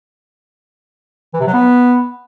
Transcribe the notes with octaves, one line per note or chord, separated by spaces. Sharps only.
E3
C3
F#3
B3